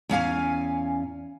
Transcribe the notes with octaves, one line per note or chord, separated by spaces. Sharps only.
E2 C#4 F5 G#5